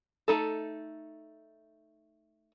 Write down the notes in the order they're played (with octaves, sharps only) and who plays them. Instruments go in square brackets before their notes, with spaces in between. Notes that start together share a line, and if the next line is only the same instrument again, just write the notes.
[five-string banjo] A3 D#4 A4